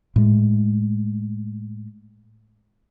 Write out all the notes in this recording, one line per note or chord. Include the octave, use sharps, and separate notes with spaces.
A2 G#3